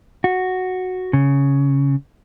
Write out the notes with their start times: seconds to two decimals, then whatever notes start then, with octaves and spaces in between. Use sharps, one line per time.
0.24 F#4
1.13 C#3